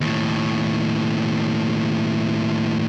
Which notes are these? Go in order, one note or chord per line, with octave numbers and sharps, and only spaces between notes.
D#2 A2